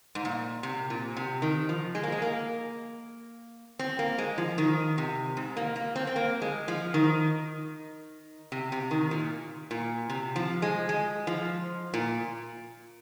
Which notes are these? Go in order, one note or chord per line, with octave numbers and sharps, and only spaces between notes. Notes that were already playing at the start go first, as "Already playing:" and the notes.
G#2
A#2
C3
A#2
C3
D#3
F3
G#3
A#3
G#3
A#3
C4
A#3
G#3
F3
D#3
C3
G#2
A#3
A#3
C4
C4
A#3
G#3
F3
D#3
C3
C3
D#3
A#2
A#2
C3
F3
G#3
G#3
F3
A#2